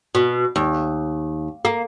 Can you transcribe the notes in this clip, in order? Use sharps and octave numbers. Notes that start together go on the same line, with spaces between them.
B2
D#2
A#3